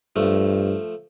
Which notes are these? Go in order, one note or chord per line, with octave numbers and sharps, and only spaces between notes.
G2 F3 A3